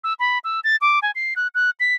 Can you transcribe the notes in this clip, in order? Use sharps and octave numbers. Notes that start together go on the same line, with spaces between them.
E6
B5
E6
A6
D6
G#5
C7
F#6
F#6
B6